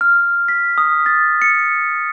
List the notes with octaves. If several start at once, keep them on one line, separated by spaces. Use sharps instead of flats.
F6
B6
D#6
A6
C#7